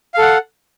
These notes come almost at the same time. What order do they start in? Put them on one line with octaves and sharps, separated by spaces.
F5 A4 F#5